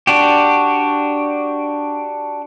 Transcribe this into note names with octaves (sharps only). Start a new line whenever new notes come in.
D4 F#4 G4